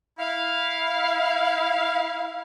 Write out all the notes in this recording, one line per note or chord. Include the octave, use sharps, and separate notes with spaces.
E4 F5